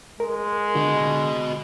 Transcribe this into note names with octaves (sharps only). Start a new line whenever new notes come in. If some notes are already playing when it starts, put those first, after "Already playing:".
G#3 A#4
D3 F#4 D#5